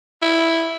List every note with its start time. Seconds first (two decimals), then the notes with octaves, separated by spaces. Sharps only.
0.22 E4